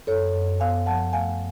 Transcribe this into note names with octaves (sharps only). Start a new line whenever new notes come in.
F#2 A4 C#5
F#2
B3 F5 G#5
F3 F#5 A5
A3 F5 G#5